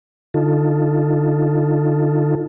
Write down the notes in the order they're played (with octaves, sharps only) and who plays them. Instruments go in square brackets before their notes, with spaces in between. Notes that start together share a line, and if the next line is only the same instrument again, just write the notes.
[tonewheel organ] D3 D#4 F4 A4